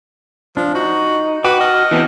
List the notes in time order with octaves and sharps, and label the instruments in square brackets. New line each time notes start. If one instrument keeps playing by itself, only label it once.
[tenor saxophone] F3 [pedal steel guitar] D4
[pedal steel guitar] D#4 [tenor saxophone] F#4
[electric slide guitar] F#4 [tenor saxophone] B4 [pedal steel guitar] G5 D6
[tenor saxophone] D#5 [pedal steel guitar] A5 F6
[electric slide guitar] E3 B3 C4